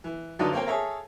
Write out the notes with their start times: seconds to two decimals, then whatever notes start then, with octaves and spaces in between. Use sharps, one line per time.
0.04 E3
0.39 D3 F#3 D4 D#4 F4 B4
0.52 A#3 C4 C#5 F5 G5
0.67 G#4 A4 C#5 E5 F5 A#5